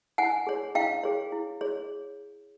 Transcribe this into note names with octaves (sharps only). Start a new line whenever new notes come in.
E4 F#5 G#5
G#4 C#5
E4 F5 G5
G#4 C#5
E4
G#4 C#5